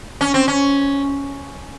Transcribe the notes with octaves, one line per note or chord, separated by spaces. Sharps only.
C#4
C4
C#4